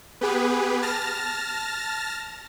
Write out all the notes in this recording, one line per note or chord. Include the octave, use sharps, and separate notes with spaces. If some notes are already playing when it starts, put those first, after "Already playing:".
B3 G4 G#4 B4
A5 F6 A6 A#6